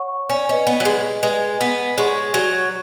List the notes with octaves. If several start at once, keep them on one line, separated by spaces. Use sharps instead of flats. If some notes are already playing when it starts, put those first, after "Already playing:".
Already playing: C#5 F#5 C#6
C#4
C#4 B4 D#5 G#5
B3
F#3
G#3
G#3 B4 D#5 G#5
B3
G#3 C#5 F#5 C#6
F#3